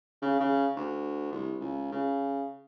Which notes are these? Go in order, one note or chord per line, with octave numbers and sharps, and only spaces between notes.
C#3
C#3
D2
C2
C#2
C#3